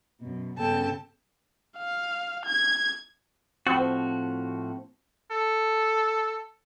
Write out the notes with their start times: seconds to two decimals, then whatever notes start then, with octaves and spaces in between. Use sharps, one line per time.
0.20 F#2 B2
0.58 G2 C#3 B3 A4 G5 A5
1.78 F5
2.46 G#6
3.67 A2 F3 C4 F#4
5.31 A4